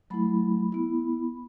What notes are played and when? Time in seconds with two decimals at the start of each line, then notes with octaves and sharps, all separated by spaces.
0.10 F#3 A3 E4 B5
0.72 B3 E4